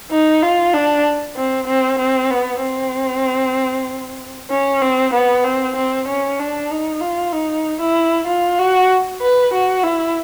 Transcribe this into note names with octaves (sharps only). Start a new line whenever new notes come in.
D#4
F4
D4
C4
C4
C4
B3
C4
C#4
C4
B3
C4
C4
C#4
D4
D#4
F4
D#4
E4
F4
F#4
B4
F#4
E4